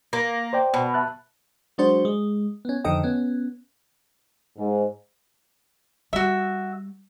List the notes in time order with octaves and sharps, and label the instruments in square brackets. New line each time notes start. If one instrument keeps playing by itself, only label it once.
[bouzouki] A#3
[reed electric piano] C5 D5 G5
[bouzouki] B2
[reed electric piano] E5 A5 F#6
[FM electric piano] F#3 G#3 D4 F#4 C5
G#3
B3 C#4
F2 D3 D#3 A4 D#5 G5
B3 C#4
[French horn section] G#2
[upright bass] G3 [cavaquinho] F#4 E5